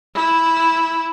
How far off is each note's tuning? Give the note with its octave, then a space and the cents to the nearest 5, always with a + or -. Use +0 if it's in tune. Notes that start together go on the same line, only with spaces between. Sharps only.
E4 -10